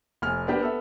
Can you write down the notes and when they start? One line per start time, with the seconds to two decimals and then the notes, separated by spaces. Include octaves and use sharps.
0.22 F1 G#5 F6
0.47 A#3 B3 D4 G4 A#4 B4
0.60 B3 A4 E5